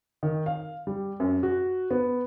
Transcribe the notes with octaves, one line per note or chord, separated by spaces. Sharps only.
D#3
F5
G3
F#2
F#4
B3